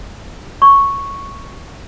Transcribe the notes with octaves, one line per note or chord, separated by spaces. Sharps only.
C#6